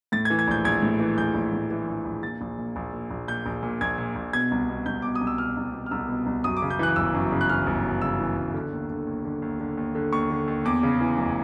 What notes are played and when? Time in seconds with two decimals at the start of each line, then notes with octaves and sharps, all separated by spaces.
0.12 A2 A6
0.25 G#6
0.30 E3
0.39 G#6
0.48 A#1 G6
0.65 A#1 G#6
0.82 A2
0.99 E3
1.18 A#1 G6
1.34 A#1
1.52 A2
1.71 E3
1.88 A#1
2.05 A#1
2.23 A#2 A6
2.41 A#1
2.58 A#2
2.76 A#1
2.93 A#2
3.10 A#1
3.28 A#2 G6
3.46 A#1
3.63 A#2
3.81 A#1 G#6
3.98 A#2
4.16 A#1
4.33 B2 G#6
4.51 C2
4.69 B2
4.86 C2 G6
5.02 B2 D6
5.15 D#6
5.21 C2
5.27 E6
5.38 B2 F6
5.57 C2
5.74 B2
5.86 F6
5.91 C2 E6
6.08 B2
6.26 C2
6.44 F#2 D#6
6.57 D6
6.62 C#3
6.70 G6
6.79 E3 F#6
6.96 G1 E6
7.14 F#2
7.32 C#3
7.41 F#6
7.49 E3 F6
7.67 G1
7.85 F#2
8.02 C#3 E6
8.19 E3
8.37 G1
8.54 D3
8.73 D#2
8.90 D3
9.07 D#2
9.25 D3
9.42 D#2
9.60 D3
9.77 D#2
9.95 D3
10.13 D#2 C#6
10.30 D3
10.48 D#2
10.65 E2 D6
10.83 C#3
11.01 E3
11.17 F1